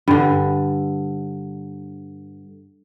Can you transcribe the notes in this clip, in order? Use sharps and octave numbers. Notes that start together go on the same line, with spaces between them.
G2 D3